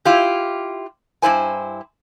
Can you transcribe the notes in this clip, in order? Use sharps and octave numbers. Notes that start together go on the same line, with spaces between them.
E4 F4 G4
G2 A#2 E4 C5 G#5